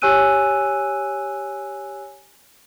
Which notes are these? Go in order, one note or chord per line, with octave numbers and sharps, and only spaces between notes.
G4 C#5 G#5 E6 F#6 D#7